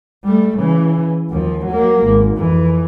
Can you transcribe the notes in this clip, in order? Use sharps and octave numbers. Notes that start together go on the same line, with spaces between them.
G3 A3
C#3 E3
D#2 F3
F#3 A#3
G#1
F2 E3